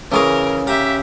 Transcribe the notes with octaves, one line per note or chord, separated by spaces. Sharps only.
C#3 E3 G#4 A#4 C#5 D6
G4 E5 F5 A#5